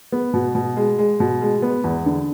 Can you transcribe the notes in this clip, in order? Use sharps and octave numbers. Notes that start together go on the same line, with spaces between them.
B3
B2
B2
G#3
G#3
B2
G#3
B3
E2
D3